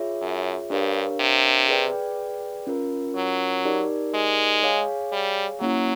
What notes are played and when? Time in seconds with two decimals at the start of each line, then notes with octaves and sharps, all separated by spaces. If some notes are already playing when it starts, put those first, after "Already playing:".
Already playing: F4 G#4 C#5 E5
0.22 F#2
0.70 G2 D4 G4 A#4 C#5 F5
1.20 C3
1.69 G#4 B4 D5 G5
2.67 C#4 F4 A#4
3.16 F#3
3.65 D#4 G4 A#4 D5
4.14 G#3
4.62 G#4 C#5 F5 G#5
5.12 G3
5.60 F#3 A#3 C#4 E4